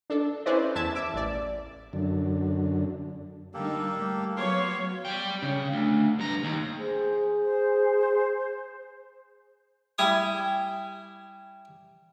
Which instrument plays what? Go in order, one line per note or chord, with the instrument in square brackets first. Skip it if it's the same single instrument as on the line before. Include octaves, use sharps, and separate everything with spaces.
[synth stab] D4 A4
C#4 E4 B4 C5 D5 D#5
E2 E5 A5 G#6 A6 E7
E5 D6 E6
A1 D5
[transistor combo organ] F#2 D3
[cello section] D3 G3 D#4 [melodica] A#3 G4 A4
[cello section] A2
[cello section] F#3 B3 [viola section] F#4 C#5 [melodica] F5 C6 D6
[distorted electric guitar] G3 G5
C#3
D2
G2 A#5
D#2
[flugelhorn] G#4 [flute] C5
[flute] C5
[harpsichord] G3 E4 G#5 D#6